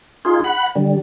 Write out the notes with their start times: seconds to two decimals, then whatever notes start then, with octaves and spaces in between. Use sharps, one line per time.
0.25 D#4 F4 G#4 C6
0.44 F#5 B5
0.76 D3 G3